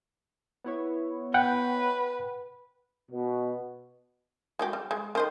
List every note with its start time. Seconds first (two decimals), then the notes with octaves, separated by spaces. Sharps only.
0.64 B3 E4 C#5
1.34 B4 F#5 G5
3.11 B2
4.59 G#3 F#4 G4
4.73 G3
4.91 G#3
5.15 D#3 C5 D#5